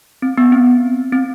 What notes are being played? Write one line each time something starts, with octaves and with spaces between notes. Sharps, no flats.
C4
B3
C4
C4